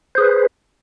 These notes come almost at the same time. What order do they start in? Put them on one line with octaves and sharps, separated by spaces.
C5 G#4 B4